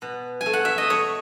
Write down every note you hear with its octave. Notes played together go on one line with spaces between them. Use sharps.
B2
G#5
A3
F#5
E5
D#5
A3 C#5